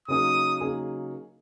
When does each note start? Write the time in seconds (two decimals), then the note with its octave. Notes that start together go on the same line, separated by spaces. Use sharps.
0.08 C#3 F#3 A#3 D#4 G#4 D#6
0.60 C#3 F#3 A#3 D#4 G#4